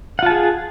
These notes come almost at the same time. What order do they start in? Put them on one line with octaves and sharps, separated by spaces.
F#5 F4 A5 G#4